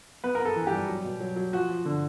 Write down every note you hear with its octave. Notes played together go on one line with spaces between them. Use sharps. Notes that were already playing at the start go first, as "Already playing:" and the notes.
B3 B4
B3 A#4
A4
E3
G4
G3
F#3
B2
F#3
F#3
F3 F#4
F3
D3